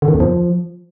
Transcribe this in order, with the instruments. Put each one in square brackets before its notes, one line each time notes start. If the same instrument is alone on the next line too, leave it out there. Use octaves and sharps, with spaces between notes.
[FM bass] D3
D#3
E2
F3